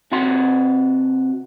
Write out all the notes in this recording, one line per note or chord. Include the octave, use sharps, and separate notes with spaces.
C3 F#4 F#5 C6